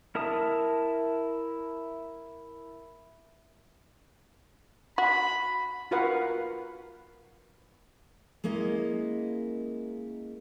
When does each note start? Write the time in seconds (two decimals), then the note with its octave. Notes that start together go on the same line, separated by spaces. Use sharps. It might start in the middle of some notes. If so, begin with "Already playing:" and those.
0.15 E4 A#4 E5 A5 D#6
4.98 F#4 B5
5.91 F4 F#4 A#4 B4 F5 F#5
8.44 G#3 A#3 C#4 E4 D#5